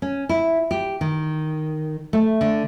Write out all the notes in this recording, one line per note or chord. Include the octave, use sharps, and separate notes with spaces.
C#4
E4
G4
D#3
A3
D3